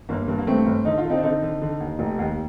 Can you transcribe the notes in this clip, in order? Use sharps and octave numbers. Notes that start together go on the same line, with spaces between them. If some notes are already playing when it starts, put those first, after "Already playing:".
G1 A#3
G2
A#3
G2 A3 C4
G1
D3 D#4
F4
D3
C4 D#4
D4
D3 C4 D#4
D3
D3
D#2
F1
D#2